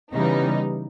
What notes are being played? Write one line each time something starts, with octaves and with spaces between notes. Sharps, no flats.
C#3 E3 G3 B3 D#4